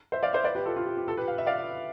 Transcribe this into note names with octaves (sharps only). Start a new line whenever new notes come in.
C5 E5
D5 F5
C5 E5
B4 D5
G4 B4
F4 A4
F4
G4
G4
F4 A4
G4 B4
F5
E5
D5 F5